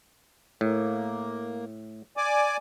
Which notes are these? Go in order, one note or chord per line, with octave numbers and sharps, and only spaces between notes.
A2 A#3
D5 G#5 D6